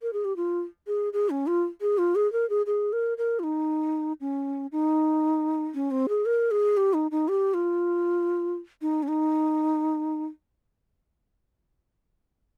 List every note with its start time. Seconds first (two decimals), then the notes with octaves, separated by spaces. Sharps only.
0.02 A#4
0.13 G#4
0.25 G4
0.36 F4
0.87 G#4
1.13 G#4
1.30 C#4
1.47 F4
1.81 G#4
1.98 F4
2.15 G#4
2.32 A#4
2.50 G#4
2.66 G#4
2.93 A#4
3.18 A#4
3.39 F4
3.44 D#4
4.21 C#4
4.72 D#4
5.74 C#4
5.91 C4
6.09 G#4
6.26 A#4
6.51 G#4
6.77 G4
6.94 D#4
7.11 D#4
7.28 G4
7.54 F4
8.82 D#4
9.03 C#4
9.08 D#4